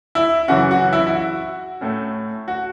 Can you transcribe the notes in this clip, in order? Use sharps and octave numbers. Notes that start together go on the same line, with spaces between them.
E4
F#2 C#3 E3 C#4 F#4
F#4
E4
E4
F#4
A2 A3 C#4
F#4